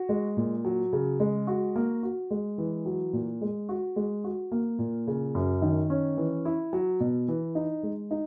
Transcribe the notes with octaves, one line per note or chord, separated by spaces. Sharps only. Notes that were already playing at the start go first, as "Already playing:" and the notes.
Already playing: F#4
G#3
A#2
F#3
C#3
G#3
F#4
A#3
F#4
G#3
E3
F#3
A#2
G#3
F#4
G#3
F#4
A#3
A#2
C#3
F#2
D#3
C#4
E3
E4
F#3
B2
E3
D#4
G#3
D#4